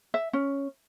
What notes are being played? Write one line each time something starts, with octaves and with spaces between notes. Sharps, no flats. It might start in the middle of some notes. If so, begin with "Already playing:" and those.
E5
C#4